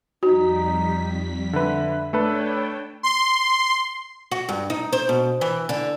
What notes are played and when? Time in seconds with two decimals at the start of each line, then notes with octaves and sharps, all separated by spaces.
0.23 F2 G3 D#4 F#4 B6
1.53 D3 B4 E5
2.13 A3 D4 A4 B4 C#5 G5 A5
3.03 C6
4.31 F#4
4.49 G2
4.70 D#4
4.93 C5
5.09 B2
5.41 E3
5.69 D3